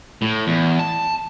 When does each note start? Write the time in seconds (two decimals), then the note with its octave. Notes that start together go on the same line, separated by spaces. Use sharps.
0.22 A2
0.47 E2
0.79 A5